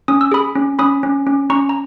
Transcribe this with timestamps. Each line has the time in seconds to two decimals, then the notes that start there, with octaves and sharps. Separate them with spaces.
0.08 C#4 D#6
0.21 E6
0.32 G#4 B5 D#6
0.55 C#4
0.79 C#4 B5 D#6
1.03 C#4
1.27 C#4
1.50 C#4 A#5 C#6
1.69 A#5